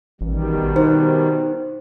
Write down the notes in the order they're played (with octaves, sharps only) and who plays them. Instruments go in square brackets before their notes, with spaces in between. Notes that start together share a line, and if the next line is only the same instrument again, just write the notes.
[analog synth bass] A1 [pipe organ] B2 D#3 G3
[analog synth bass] D#4 [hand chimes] C5